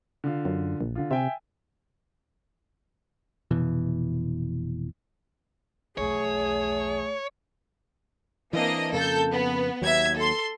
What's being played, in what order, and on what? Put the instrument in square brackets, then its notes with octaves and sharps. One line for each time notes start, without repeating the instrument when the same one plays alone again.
[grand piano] D3 F4
[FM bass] F#2
A#1
[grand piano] D3 F4
[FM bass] C3 [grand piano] E5 G5 G#5
[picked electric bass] F1 B2 E3
[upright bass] B1 E2 [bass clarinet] A3 [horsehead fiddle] G#4 [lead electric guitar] C#5
[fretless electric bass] E3 C4 [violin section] A#3 D4 D#5
[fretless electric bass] F2 C#3 A#3 [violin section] A4 G6
[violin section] B3
[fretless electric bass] D#2 F#3 [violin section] E5 G#6
[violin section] A4 C6